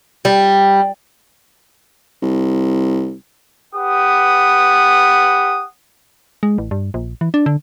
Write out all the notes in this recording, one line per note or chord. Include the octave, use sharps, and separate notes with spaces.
G3
C2
G4 B4 F#5 D#6
G#3
A1
G2
A#1
E3
D4
D3